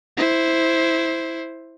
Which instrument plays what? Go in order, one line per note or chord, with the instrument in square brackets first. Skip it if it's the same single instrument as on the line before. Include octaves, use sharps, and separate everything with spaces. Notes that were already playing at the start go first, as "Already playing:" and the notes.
[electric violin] E4 C5